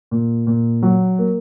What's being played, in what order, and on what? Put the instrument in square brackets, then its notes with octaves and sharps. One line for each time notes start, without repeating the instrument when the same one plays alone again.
[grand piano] A#2
A#2
F#3
A#3